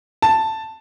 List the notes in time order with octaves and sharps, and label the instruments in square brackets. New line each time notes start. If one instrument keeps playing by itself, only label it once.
[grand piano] A5